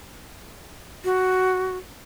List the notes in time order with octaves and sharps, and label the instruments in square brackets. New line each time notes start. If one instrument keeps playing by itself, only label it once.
[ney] F#4